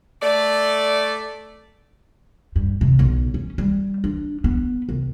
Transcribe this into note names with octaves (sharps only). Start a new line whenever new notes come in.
A3 D5
G2
C3
B1
C#4
G3
D4
B3
C2